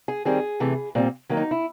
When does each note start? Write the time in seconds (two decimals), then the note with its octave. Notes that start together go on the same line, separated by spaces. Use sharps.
0.08 G#4
0.25 D#3 G3 C4 G#4
0.60 C3 E3 A3
0.95 A#2 G3 C4
1.29 D#3 F#3 A#3
1.37 D#4
1.51 E4